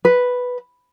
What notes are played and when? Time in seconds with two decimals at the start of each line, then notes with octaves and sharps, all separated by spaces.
0.05 B4